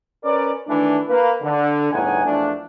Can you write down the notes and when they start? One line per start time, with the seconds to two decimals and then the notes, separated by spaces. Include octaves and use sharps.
0.24 C#4 A#4 B4 D5
0.68 D#3 E3 A3 D4
1.09 A#3 B4
1.43 D3
1.93 G1 E2 A2 D#4 F#5 G#5
2.25 E2 F3 A3 D4